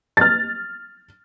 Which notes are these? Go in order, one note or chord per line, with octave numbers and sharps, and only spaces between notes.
F6 A6